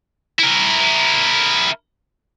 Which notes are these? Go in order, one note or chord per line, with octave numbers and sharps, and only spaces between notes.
E4 A#4